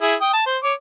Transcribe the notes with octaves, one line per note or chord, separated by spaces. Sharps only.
E4 G#4
G5 D#6
A5
C5
C#5 D6